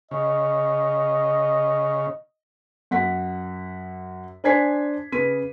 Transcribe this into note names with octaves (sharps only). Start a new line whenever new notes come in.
C#3 D#5
F#2 F#5 B6
D4 C5 G#5 G#6 B6 C7
C#3 B4 B6 D#7